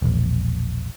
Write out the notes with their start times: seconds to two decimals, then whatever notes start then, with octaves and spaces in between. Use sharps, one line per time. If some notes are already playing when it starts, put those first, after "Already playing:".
0.02 E1 A#1